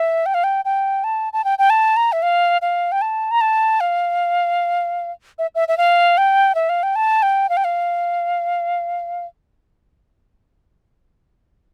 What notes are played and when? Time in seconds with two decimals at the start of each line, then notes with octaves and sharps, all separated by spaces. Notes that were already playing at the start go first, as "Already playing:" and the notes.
Already playing: E5
0.26 G5
0.34 F5
0.44 G5
0.65 G5
1.04 A5
1.33 A5
1.44 G5
1.59 G5
1.70 A5
1.97 A#5
2.12 E5
2.23 F5
2.62 F5
2.92 G5
3.02 A5
3.31 A#5
3.41 A5
3.80 F5
5.39 E5
5.55 E5
5.68 E5
5.78 F5
6.18 G5
6.55 E5
6.69 F5
6.83 G5
6.96 A5
7.23 G5
7.49 F5
7.57 G5
7.64 F5